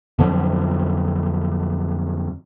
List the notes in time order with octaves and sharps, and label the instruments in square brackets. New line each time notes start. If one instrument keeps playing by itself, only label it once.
[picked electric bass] F2 D3 F3 F#3